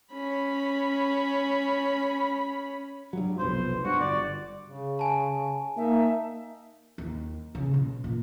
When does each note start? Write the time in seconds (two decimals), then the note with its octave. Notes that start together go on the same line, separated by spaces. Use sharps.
0.13 C#4 B5
3.13 G2 F#3
3.39 F1 B1 B3 C5
3.85 G2 F#4
4.01 G1 D5
4.67 C#3
4.99 G#5 A5
5.77 A#3 D#4 E5
6.98 D#2
7.55 C#3
7.74 B2
8.04 A#2